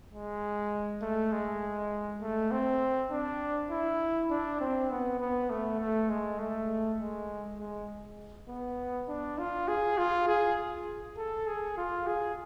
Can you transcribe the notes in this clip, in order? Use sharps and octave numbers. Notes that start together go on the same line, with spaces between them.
G#3
A3
G#3
A3
C4
D4
E4
D4
C4
B3
B3
A3
A3
G#3
A3
G#3
G#3
B3
D4
F4
G#4
F4
G#4
A4
G#4
F4
G#4